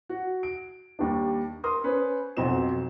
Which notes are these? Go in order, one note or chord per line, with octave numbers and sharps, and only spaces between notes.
F#4
D7
D#2 G3 D4
A#4 C6 D#6
C#4 B4 C5
B1 F2 C4 F#4 C5 E7